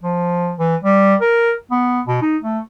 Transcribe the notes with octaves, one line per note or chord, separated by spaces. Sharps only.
F3
E3
G3
A#4
B3
B2
D#4
A3